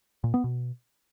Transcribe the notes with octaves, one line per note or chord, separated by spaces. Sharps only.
A#2
B3
B2